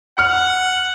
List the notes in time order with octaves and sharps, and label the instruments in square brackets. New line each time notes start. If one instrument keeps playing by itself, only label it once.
[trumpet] F#5 [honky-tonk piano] F6 C#7